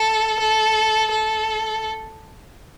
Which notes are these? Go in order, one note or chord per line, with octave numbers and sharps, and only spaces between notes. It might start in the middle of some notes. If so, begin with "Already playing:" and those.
Already playing: A4
A4
A4